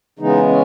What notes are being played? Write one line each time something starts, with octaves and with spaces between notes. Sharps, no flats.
C#3 E3 G#3 B3 D#4
C#4